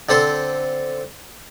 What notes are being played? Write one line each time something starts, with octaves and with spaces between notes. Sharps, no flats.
D3 C4 A4 C5